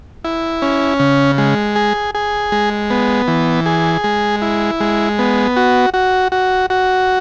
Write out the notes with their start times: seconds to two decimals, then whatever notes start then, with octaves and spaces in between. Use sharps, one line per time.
0.25 E4
0.62 C#4
0.99 C#3
1.38 G#3
1.75 G#4
2.15 G#4
2.52 G#3
2.90 B3
3.28 E3
3.66 G#4
4.04 G#3
4.42 E4
4.80 G#3
5.19 B3
5.56 F#4
5.94 F#4
6.32 F#4
6.70 F#4